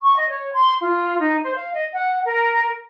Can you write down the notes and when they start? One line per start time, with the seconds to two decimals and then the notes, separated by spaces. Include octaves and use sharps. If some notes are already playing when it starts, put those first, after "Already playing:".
0.01 C#6
0.16 D#5
0.30 C#5
0.53 C6
0.82 F4
1.20 D#4
1.42 C5
1.55 F5
1.74 D#5
1.93 F#5
2.25 A#4